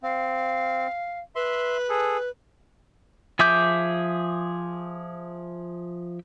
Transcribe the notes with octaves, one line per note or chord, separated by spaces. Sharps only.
C4 F5
B4 E5 C6
G#4 A4
F3 G#4 E5 D6 G6